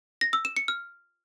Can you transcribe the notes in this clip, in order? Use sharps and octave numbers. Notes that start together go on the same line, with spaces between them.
A#6
E6
E7
C#7
F6